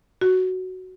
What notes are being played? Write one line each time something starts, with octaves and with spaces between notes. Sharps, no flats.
F#4